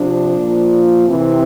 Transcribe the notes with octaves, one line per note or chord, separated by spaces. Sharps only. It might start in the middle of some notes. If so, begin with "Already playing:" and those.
Already playing: C3 F3 D4
A#2 F3
C3 E3 C4